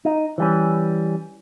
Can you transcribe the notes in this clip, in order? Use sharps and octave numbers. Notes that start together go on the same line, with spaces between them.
D#4
E3 G3 C#4